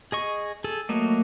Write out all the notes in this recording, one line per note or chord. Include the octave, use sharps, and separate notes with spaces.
G#4 D#5 C#6
G#4 A4
F#3 A3 A#3 D#5